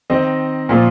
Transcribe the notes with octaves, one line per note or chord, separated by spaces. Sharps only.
D#3 C4 D#4 C5 D#5
A#2 F3 A#3 F4